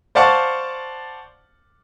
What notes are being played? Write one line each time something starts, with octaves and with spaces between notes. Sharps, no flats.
C5 D5 F5 F#5 A5 C#6